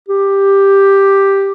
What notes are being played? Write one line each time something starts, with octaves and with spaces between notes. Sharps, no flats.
G4